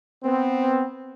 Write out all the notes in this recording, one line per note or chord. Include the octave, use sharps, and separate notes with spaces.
B3 C4